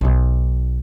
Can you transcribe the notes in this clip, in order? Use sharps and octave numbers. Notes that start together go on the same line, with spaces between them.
B1 D#4